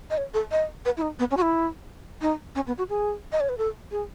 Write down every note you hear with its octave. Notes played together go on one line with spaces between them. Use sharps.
D#5
C#5
A4
D#5
B4
E4
D#4
B3
C#4
F#4
E4
D#4
C#4
B3
F#4
G#4
D#5
C#5
B4
A4
G#4